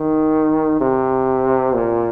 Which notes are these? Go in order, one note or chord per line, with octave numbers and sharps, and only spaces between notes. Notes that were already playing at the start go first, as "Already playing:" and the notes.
Already playing: D#3
C3
A#2